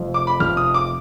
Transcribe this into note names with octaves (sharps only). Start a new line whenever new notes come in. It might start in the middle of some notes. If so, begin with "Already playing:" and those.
Already playing: F1 F2 F3
D6
B5
F1 F2 F3 F6
D#6
D6